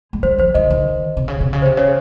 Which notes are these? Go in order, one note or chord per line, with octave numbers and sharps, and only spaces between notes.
G#3
G3 C5
F3 C5
D#3 D#5
D#3
C3
C#3
C3
C#3
C5
C3
C#3 C#5